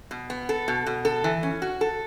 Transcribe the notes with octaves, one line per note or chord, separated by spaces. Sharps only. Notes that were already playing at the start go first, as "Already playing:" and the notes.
B2
B3
A4
B2
B2
A4
E3
C#4
F#4
A4